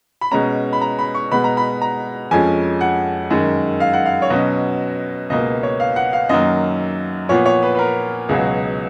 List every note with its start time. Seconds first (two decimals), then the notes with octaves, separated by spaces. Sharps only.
0.21 B5
0.31 B2 G#3 C#4 A#5
0.73 B5
0.81 A#5
0.99 B5
1.15 C#6
1.31 B2 G#3 B3 B5
1.44 A#5
1.57 B5
1.82 A#5
2.31 F2 F3 G#3 C#4 G#5
2.81 F#5
3.30 F#2 D#3 G#3
3.80 F5
3.93 F#5
4.06 F5
4.22 C#5
4.30 B2 F#3 C#4 D#5
5.30 C#2 B2 A#3 D#5
5.63 C#5
5.80 F5
5.96 F#5
6.13 F5
6.29 F#2 D#3 F#3 A#3 D#5
7.29 A#2 F3 B3 C#5
7.46 C#5
7.63 B4
7.75 B4
7.79 A#4
8.29 C#2 B2 F#3 G#4